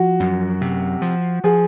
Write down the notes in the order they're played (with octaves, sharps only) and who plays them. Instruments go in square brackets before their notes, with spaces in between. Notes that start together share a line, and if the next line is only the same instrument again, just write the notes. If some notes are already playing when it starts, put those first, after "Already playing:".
Already playing: [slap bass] F3 [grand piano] F#4
[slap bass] F#2
C3
F3
[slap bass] F3 [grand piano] G#4